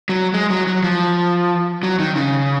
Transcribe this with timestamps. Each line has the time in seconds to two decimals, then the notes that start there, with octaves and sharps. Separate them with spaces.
0.09 F#3
0.34 G#3
0.50 F#3
0.67 F#3
0.84 F3
1.83 F#3
2.00 D#3
2.16 C#3